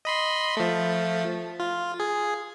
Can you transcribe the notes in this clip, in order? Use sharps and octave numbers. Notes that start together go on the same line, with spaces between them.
D#5 B5 C6
F3 A3
F4
G#4